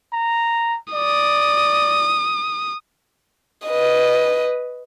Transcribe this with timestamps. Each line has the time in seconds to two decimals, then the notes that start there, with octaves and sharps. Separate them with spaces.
0.13 A#5
0.93 D5 D#6
3.66 B4 D#5